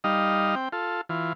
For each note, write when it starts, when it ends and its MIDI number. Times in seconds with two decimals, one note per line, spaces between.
0.04 0.55 55
0.04 0.55 63
0.04 0.55 75
0.04 0.55 77
0.55 0.69 60
0.55 0.69 79
0.72 1.01 65
0.72 1.01 69
1.09 1.33 52
1.09 1.33 65